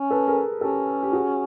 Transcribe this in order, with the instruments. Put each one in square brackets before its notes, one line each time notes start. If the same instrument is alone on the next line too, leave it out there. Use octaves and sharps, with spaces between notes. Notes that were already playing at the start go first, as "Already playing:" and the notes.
Already playing: [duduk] C#4
[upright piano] A4 B4
G#4 A#4
[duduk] C#4 [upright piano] G4 A4
[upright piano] G4
F#4 G#4